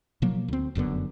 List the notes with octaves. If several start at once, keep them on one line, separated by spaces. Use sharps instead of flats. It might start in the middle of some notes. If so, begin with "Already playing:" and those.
B2 F3 F#3 A#3
D2 C4
F1 F#2 D3 B3